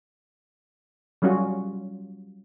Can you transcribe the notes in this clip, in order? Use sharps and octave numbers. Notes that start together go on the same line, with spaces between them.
F#3 G3 C#4 F4 F#4